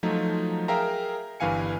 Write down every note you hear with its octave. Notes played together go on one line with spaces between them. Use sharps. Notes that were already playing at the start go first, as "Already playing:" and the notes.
F3 F#3 A3 D#4 F4
G#4 A#4 E5 F5 G5 A#5
G1 G2 E3 F5 G#5 C#7